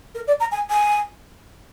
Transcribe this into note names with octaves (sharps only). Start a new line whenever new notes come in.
A#4
D5
A#5
G#5
G#5